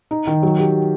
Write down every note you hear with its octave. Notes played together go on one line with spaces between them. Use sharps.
D#4
D#3
F#3
G4